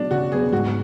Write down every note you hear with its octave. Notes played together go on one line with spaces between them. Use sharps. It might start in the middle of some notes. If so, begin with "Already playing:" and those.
Already playing: F#3 B3 D4
C#3 F#4
F#3 B3 G#4
G#2 F#4